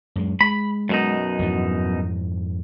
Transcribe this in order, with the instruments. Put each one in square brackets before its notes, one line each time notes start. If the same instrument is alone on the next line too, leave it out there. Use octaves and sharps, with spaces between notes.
[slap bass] F#2 G#3
[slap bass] G#3 [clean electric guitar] B5
[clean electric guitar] F#2 B2 D#4
[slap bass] F2 G#2 E3